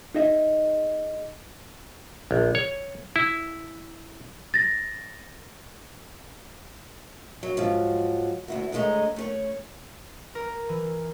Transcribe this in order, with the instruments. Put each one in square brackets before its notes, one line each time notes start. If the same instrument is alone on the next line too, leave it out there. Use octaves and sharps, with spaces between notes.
[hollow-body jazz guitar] D#4 G#4 D#5 E5
[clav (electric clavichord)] A#1
C#5
E4
[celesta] A6 A#6
[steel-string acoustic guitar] F#3
G#2 F3 F#3
D2 E4 F#4
A2 D3 G#3 A3 D#5 A#5
A3 C#4 C#5
[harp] A#4
E3